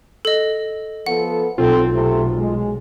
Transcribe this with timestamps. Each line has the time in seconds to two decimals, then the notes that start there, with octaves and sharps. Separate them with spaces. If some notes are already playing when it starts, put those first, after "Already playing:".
0.25 A4 D#5
1.06 F3 B3 A4 F#5
1.58 B1 C4 F4 A4
1.93 C3 A3
2.38 G#3